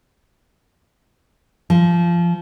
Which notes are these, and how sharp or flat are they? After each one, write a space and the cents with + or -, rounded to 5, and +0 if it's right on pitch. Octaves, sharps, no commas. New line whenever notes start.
F3 -20